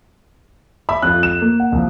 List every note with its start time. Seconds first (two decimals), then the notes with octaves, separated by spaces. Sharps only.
0.89 E5 B5
1.02 F2 F4 F#6
1.23 E7
1.41 A#3
1.60 F#5
1.72 C2 F3